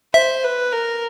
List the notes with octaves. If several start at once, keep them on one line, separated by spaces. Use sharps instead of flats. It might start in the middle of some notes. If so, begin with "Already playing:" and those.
C5 E5
B4
A#4